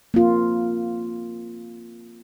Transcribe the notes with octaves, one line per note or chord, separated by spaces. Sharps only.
A#3 C4 F4